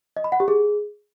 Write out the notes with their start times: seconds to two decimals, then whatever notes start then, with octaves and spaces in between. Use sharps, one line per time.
0.17 D#5
0.24 B5
0.32 F#5
0.40 G4
0.48 G#4